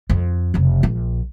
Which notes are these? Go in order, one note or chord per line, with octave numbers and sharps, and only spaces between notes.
F2
F1 C#3
A#1